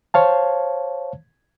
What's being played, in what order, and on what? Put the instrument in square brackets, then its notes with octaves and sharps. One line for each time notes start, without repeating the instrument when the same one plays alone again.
[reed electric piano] C5 C#5 F5 A5